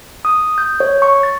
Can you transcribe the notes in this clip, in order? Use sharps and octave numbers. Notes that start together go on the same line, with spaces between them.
D#6
G6
C#5
C#6
A6